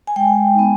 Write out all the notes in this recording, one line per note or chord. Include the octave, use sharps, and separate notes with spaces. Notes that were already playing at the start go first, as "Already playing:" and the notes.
G#5
G#3 G5
B3 D#4